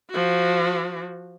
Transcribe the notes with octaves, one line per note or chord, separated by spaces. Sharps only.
F3 F#4